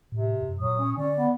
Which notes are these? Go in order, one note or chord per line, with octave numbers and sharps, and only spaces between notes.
A2 C3
F#2
A#2 F#3 D#6
C#4
D3 C#4 D5
B3